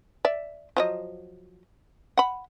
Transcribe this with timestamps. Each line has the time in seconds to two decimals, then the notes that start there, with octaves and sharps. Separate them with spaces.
0.25 D5 E5
0.77 F3 F#3 D#5
2.17 F#5 B5